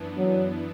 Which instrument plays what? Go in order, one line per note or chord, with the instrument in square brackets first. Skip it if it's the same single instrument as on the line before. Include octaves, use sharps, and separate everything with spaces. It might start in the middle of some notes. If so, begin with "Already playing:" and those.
Already playing: [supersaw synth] F#2 E3 B3 D4
[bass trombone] F#3